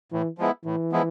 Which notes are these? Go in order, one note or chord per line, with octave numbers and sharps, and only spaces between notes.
A2 E3
F3 G#3 B3 E4
A2 E3
F3 G#3 B3 E4